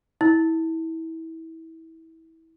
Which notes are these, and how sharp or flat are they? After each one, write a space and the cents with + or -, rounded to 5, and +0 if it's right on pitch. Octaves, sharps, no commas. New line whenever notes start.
E4 -25